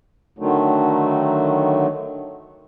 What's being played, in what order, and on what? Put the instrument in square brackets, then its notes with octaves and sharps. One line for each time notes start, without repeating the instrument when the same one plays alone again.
[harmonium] D3 D#3 F#3 A3